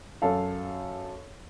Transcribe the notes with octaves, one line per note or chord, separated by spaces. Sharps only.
F#2 A4 F5